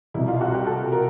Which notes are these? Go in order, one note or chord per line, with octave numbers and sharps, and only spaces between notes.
C2 B2 E4
F4
F#4
G4
A4
A#4